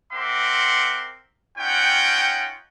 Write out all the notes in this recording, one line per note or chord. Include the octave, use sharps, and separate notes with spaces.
C4 A#4 E5 F#5 C6 D6
C#4 D#4 F4 F#5 G5